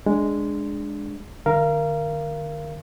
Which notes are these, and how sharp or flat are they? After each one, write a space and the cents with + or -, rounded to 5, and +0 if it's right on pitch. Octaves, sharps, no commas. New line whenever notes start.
G#3 +0 D4 +0
D3 +45 A#4 +0 F5 -30